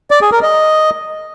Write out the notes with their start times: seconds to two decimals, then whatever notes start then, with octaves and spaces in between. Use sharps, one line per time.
0.11 D5
0.21 G#4
0.32 A#4
0.42 D#5